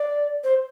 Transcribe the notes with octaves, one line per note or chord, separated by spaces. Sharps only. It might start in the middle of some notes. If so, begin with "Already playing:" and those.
Already playing: D5
C5